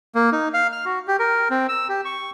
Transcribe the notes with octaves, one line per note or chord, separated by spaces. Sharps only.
A#3
D#4
F5
F6
F#4
G4
A#4
C4
E6
G4
C#6